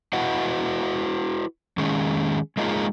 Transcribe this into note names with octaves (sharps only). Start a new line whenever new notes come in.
E4 F#4 B4 D#5 F#5
D#3 G#3 C#4 G#4
G#3 A#3 D#4 F4 G#4